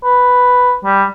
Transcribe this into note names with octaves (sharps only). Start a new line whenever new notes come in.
B4
G3